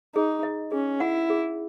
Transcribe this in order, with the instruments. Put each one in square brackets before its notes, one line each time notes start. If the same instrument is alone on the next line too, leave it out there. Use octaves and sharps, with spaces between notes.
[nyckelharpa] D#4 [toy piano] G#4
[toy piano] D#5
[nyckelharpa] C#4 [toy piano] G#4
[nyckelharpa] E4 [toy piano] F#5
[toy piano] G#4